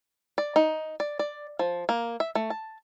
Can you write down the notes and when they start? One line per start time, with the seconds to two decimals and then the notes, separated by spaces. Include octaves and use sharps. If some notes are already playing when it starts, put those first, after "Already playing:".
0.38 D5
0.56 D#4
1.00 D5
1.19 D5
1.59 F3
1.89 A#3
2.20 E5
2.35 A3
2.50 A5